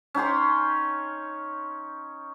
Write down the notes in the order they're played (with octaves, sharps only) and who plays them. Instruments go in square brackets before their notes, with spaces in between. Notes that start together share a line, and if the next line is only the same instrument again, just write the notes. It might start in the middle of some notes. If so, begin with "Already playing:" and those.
[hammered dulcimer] C#4 D#4 G5 C6